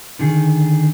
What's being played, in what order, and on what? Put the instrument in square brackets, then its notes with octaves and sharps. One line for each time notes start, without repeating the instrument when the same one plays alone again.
[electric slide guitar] D3 D#3 G#4